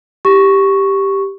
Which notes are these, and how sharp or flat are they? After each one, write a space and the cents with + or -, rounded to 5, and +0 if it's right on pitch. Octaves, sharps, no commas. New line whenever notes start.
G4 +0 C#6 +0